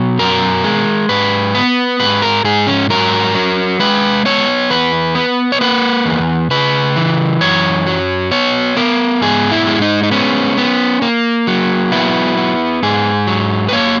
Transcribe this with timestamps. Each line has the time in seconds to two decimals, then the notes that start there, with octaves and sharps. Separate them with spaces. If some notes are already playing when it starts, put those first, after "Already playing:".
Already playing: B2 F#3
0.19 F#2 A#4
0.64 G#3
1.09 G#2 B4
1.55 B3
2.00 G#2 B4
2.22 A#4
2.44 G#2 G#4
2.67 C#4
2.90 F#3 A#4
3.35 F#3
3.80 G#3 B4
4.25 B3 C#5
4.70 E2 B4
5.15 B3
5.52 C#5
5.61 A#3 B4
6.06 E2
6.51 C#3 B4
6.96 E3
7.41 F#2 C#5
7.87 F#3
8.31 B3 C#5
8.77 B3 A#4
9.21 G#2 G#4
9.52 E4
9.67 G#3
9.82 D#4
10.03 D#4
10.11 B3 C#4
10.57 B3
11.02 A#3
11.47 F#3
11.92 B3 E4
12.37 B3
12.83 G#2 G#4
13.27 F#3
13.69 B4
13.73 A#3 C#5